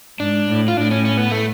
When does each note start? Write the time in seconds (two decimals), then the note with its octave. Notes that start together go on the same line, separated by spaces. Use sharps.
0.19 G#2 D4
0.48 A2
0.68 F4
0.76 A2 D4
0.91 C#4
1.05 C#4
1.17 B3
1.31 A3